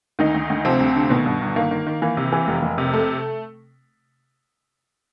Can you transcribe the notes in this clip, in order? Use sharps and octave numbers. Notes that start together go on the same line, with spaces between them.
D2 D#3 D#4
D2
D2
C3 F3 C4
D2
D3
B2 D#3 B3
G2
G1
D#3 A#3
D#3
D#3
E3 A#3
C3
E3
F1
F1
C3
A3